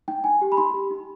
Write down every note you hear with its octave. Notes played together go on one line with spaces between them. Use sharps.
D#4 G5
D#4 G#5
G4
B5
D#4 C6
G4
D#4